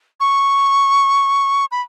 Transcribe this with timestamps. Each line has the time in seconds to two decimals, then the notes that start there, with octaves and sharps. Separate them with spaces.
0.20 C#6
1.71 B5